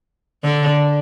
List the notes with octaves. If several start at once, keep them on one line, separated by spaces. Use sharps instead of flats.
D3 D4